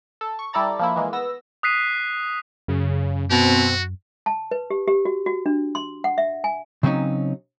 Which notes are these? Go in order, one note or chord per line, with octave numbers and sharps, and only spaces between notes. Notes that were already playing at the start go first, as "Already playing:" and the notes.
A4
C#6
G3 E4 A4 D5 A#5 A6
F3 A#3 E4
E3 G#3 A#3
B3 E6 A#6
D#6 F#6 B6 C7 D#7
F#2 C#3
B2 C4 F#4
A5
B4
G4
G4
F#4
F#4
D4
C6
F#5
E5
G#5
C#3 F#3 C4 C#4 D#4